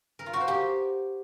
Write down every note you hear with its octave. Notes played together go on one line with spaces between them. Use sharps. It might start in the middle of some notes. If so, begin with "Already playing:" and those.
A#4
F4
F#4
C5
G4